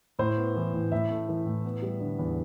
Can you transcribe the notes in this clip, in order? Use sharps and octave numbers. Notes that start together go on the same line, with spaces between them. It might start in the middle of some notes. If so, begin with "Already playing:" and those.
A2 C5
B3
E3
A2
A2 E5
A3
E3
A2
B3
G3
D3
E2